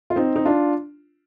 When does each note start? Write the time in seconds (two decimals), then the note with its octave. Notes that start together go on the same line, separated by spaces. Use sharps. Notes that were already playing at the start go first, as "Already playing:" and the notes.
0.10 F4
0.16 C4 D#4
0.36 D#4
0.45 D4 F4